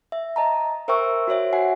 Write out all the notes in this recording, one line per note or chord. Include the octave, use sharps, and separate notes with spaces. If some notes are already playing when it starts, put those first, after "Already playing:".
E5
D#5 A5 A#5
A#4 C5 E5 G5 C#6 E6
F#4 C5 C#5 E5
F#4 E5 F#5 G#5 C7